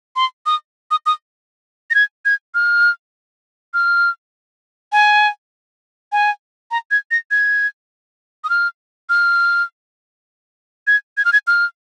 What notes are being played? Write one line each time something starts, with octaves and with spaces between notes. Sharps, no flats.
C6
D#6
D#6
D#6
A#6
G#6
G#6
F6
F6
G#5
G#5
A#5
G#6
A#6
G#6
D#6
F6
F6
G#6
G#6
F6
G#6
F6